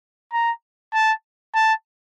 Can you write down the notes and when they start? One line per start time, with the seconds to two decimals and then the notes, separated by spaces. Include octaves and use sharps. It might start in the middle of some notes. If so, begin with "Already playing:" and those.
0.33 A#5
0.94 A5
1.55 A5